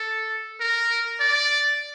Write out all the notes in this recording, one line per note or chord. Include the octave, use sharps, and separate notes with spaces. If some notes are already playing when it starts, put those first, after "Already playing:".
Already playing: A4
A#4
D5